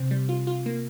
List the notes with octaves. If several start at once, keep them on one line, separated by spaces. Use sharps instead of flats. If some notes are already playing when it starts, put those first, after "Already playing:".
Already playing: C3 C4
G3
F4
F4
A#3